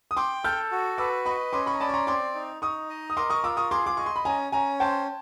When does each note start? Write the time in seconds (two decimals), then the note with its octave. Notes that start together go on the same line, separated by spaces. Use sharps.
0.11 D#6
0.17 G5 C6 D6
0.44 A4 F6 G6
0.72 F#4
0.98 B4 D6 E6
1.25 D#5 B5 C#6
1.53 C#4 C6 D6
1.66 B5 C#6
1.74 A#5
1.81 D5 A5 B5
1.89 C#6
1.94 A#5 C6
2.07 C4 C6 D6
2.35 D#4
2.62 D#4 C#6 D#6
2.90 D#5
3.10 D#6
3.17 A#4 C6 D6
3.30 C#6 D#6
3.44 F4 D6 E6
3.57 C#6 D#6
3.71 G#4 C6 D6
3.86 D6
3.97 D#5 C#6
4.06 C6
4.16 B5
4.25 C#4 G#5 A#5
4.52 C#4 G#5 A#5
4.80 C5 G5 A5